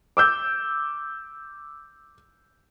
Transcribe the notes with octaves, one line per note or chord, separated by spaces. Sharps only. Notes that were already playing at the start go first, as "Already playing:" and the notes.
D6 E6 G6